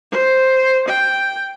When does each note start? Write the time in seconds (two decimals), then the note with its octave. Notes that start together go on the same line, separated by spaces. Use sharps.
0.11 C5
0.88 G5